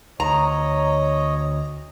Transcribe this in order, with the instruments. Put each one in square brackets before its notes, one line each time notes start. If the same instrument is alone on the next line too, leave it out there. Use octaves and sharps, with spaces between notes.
[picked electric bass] D2 [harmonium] C#5 D#5 [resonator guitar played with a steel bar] A#5